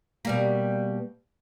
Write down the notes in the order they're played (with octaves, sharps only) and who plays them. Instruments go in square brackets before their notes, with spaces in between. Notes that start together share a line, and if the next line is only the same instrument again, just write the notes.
[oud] B2 G3 A#3